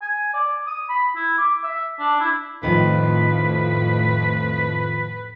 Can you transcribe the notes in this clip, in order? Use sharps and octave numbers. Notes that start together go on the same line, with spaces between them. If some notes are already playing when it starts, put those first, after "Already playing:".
G#5
D5
D#6
B5
E4
D6
E5
D4
E4
F2 A2 D#3 F3 B4